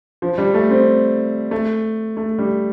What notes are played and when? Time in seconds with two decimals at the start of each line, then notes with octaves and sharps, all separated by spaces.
0.22 F3
0.38 G3
0.54 A3
0.70 C4
1.51 A3
2.17 A3
2.39 G3